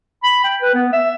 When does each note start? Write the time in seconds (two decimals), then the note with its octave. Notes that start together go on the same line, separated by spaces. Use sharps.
0.23 B5
0.44 G5
0.61 B4
0.74 B3
0.92 E5